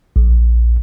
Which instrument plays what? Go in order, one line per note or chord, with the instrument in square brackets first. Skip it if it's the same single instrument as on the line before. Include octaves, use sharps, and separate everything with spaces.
[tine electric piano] A#1